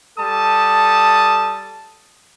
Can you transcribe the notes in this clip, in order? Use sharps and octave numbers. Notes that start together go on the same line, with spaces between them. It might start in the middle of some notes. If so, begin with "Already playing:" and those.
G3 A4 A5 D#6